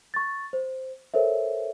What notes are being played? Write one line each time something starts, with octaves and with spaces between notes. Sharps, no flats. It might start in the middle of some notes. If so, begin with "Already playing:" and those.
C#6 A6
C5
A4 A#4 C5 C#5 E5